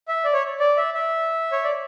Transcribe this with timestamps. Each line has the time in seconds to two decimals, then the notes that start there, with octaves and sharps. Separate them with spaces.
0.08 E5
0.25 D5
0.33 C#5
0.60 D5
0.77 E5
0.94 E5
1.52 C#5
1.64 D5